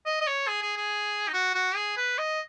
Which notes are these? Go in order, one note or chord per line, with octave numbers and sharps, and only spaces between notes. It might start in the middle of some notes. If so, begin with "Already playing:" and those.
D#5
D#5
C#5
G#4
G#4
G#4
D#4
F#4
F#4
G#4
B4
D#5